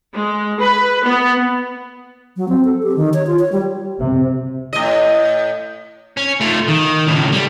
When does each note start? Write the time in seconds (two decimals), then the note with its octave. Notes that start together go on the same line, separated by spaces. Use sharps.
0.13 G#3
0.58 B4
1.03 B3
2.36 F#3
2.49 C4
2.65 A4
2.83 G4
2.96 D#3
3.14 C#5
3.27 F4
3.39 C#5
3.52 G3
4.00 C3
4.73 A2 D#5
6.17 C#4
6.41 A3 F4
6.68 D#3
7.07 C#2 A2
7.32 G3